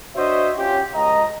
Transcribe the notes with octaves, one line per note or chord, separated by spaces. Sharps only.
D4 F#4 C5 C#5 D#5 E5
C#4 F4 G4
C#2 D#5 A#5